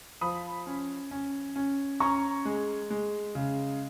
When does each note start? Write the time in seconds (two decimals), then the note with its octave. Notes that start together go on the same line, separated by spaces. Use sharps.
0.21 F3 B5 D#6
0.67 C#4
1.11 C#4
1.56 C#4
2.00 C#4 A#5 C#6
2.45 G#3
2.90 G#3
3.35 C#3